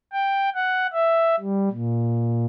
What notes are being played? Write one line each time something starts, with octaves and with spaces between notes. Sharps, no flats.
G5
F#5
E5
G3
A#2